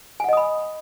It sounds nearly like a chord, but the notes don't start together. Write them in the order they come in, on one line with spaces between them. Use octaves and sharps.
G#5 F#5 D#5 D#6 B5